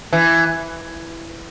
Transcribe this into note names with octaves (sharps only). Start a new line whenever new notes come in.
E3